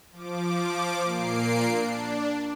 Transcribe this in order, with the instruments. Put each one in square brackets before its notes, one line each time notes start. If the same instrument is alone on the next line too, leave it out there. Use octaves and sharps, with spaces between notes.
[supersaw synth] F3 D6
A#2 A#3 C7 D7
D4